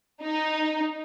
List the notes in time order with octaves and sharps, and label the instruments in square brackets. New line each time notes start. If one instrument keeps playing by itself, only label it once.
[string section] D#4